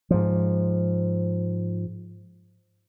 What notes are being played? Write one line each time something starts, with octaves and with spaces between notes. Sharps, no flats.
G#2 F3